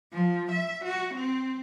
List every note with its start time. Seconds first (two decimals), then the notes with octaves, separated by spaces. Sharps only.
0.12 F3
0.51 E5
0.85 F#4
1.14 C4